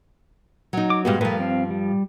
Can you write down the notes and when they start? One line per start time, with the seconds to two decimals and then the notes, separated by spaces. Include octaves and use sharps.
0.73 F#3 D#4
0.90 D6
1.05 G2 G#3 B3 F#4 G4 F5
1.21 G2 F3 A3 A#4 B4
1.40 C4 F5
1.70 G3